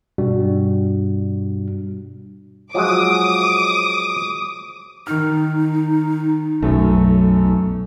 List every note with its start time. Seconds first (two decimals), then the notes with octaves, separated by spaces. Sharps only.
0.18 G2 B2 G3 D4 F#4
2.74 F3 F#3 G#3 D6 D#6
5.07 D#3 D#4 F6
6.63 B1 F#2 A3